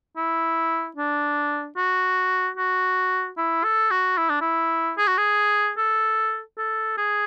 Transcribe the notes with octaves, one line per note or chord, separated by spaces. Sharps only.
E4
D4
F#4
F#4
E4
A4
F#4
E4
D4
E4
G#4
F#4
G#4
A4
A4
G#4